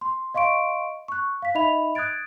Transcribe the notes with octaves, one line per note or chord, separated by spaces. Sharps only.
C6
D#5 F5 C6 C#6 D7
C#6 F#6
F5 B6
D#4 D#5 E5 B5 F7
D#6 F#6 G#6 A6 D7